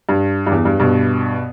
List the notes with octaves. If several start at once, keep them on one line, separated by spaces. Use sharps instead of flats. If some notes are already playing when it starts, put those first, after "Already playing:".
G2
G2
E2
G2
G2 B2